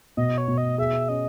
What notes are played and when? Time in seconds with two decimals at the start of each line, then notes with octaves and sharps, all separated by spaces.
0.17 B2 D#5
0.38 C#5
0.48 B2
0.58 D#5
0.78 G#4 E5
1.08 C#4 D#5